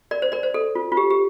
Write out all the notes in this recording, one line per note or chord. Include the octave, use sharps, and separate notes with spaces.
A#4 D5
C5
A#4 D5
C5
A4
F4
F4
G4
G4